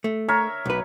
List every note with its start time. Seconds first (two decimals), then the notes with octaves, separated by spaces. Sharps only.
0.04 A3
0.29 A#4 C#5 E5
0.66 B1 B4